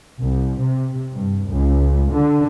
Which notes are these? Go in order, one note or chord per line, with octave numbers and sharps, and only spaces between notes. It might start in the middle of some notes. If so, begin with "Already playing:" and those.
C2
C3
G2
C#2
D3